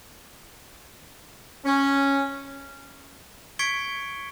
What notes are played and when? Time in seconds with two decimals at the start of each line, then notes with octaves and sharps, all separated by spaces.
1.65 C#4
3.59 C#6 G#6 B6 C#7 D7 G7